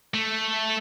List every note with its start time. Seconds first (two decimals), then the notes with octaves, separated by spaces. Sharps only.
0.14 A3